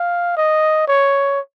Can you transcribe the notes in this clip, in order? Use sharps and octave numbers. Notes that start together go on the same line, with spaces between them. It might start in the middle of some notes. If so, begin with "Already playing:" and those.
Already playing: F5
D#5
C#5